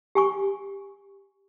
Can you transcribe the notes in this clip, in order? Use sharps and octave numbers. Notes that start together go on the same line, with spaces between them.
G4 G#5 C#6